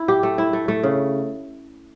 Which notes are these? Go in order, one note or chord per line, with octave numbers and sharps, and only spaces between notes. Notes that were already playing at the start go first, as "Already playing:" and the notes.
Already playing: E4
G4
A3
E4
A3
A3
C#3